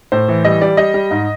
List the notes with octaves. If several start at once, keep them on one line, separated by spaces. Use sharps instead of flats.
A2 C5
E3
G3 D#5
G3 D5
G3 D#5
G3
G#2